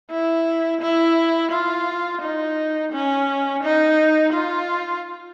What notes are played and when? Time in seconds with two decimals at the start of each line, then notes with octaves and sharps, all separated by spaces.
0.11 E4
0.81 E4
1.51 F4
2.21 D#4
2.92 C#4
3.63 D#4
4.33 F4